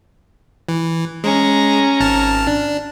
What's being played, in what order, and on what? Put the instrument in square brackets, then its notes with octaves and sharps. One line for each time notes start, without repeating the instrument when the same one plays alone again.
[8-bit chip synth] E3
[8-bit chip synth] G#3 [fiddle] C#4 A#5
[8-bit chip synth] G#1 A5 F6
D4